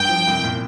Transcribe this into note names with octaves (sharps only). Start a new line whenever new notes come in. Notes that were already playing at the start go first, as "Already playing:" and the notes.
Already playing: G2 G5
F3
C2
A#2